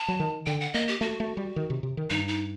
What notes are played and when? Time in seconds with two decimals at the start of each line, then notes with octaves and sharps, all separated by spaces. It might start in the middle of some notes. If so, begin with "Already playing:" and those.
Already playing: A5
0.08 F#3
0.20 D#3
0.46 D3 G5
0.61 F#5
0.74 A#3 D#5
0.88 G4
1.01 A3 F#4
1.20 A3
1.37 G3
1.56 D#3
1.70 C3
1.83 C3
1.97 D#3
2.10 G2 D#4
2.28 D#4